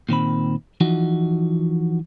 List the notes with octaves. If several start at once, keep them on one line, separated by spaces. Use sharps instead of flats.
A#2 D#3 C4 B5
E3 F3 D#4 F#4